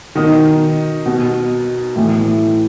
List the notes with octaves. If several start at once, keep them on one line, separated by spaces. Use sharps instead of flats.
B2 D#3 D#4
B2
A2 E3